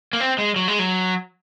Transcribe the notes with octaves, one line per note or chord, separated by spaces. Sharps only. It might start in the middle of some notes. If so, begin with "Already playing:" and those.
A#3
C4
G#3
F#3
G#3
F#3